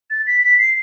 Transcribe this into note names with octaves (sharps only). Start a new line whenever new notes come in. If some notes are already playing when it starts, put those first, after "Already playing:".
A6
B6
B6
C7